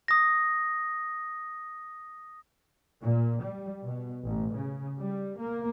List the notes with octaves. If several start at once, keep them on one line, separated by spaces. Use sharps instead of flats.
D#6 A#6
A#2
G3
B2
A1
C#3
G3
A#3